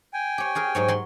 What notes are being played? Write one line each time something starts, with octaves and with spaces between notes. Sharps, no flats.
G5 G#5
G4 C#5
F#4 G#4 A#4
G#2 F#3 C#5
F#3 C6